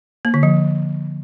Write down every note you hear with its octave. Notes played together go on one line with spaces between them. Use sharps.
A#3
D3
F3